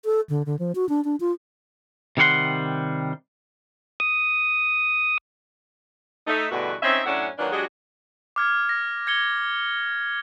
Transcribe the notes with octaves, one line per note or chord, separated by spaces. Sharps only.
A4
D3
D3
F3
F#4
D4
D4
F4
C3 D#3 G3 C#5 F#5 C6
D#6
A3 D#4
E2 G2 B2 D3 A3 F#4
C4 C#4 D#4 E5
F#2 A2 C#4 D4 E4 F#5
D#3 E3 F#3 A#3 D4 F4
F#3 G#3 D4 F#4 G4 D#5
D6 F6 G#6
A#6
G#6 C#7 G7